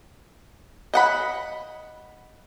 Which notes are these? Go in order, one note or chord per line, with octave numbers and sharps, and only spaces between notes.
D#5 F#5 B5